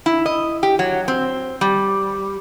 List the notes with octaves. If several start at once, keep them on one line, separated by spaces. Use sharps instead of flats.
E4
D#5
G4
F#3
C4
G3